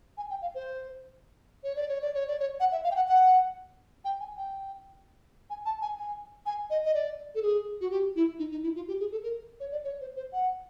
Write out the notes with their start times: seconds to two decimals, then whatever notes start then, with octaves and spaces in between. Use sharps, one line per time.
0.17 G#5
0.30 G5
0.42 F5
0.55 C5
1.63 C#5
1.76 D5
1.89 C#5
2.01 D5
2.14 C#5
2.27 D5
2.40 C#5
2.60 F#5
2.72 E5
2.84 F5
2.91 G5
2.96 F#5
3.08 F#5
4.05 G5
4.20 G#5
4.37 G5
5.50 G#5
5.65 A5
5.82 G#5
5.98 G#5
6.46 G#5
6.70 D#5
6.85 D#5
6.94 D5
7.35 A4
7.42 G#4
7.81 F#4
7.91 G4
8.16 E4
8.39 D#4
8.51 D#4
8.63 E4
8.76 F4
8.88 G4
9.00 G#4
9.12 A4
9.23 A#4
9.60 C#5
9.72 D5
9.84 C#5
10.01 C5
10.16 C5
10.33 F#5